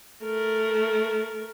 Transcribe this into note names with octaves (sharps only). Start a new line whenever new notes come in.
A3 A#4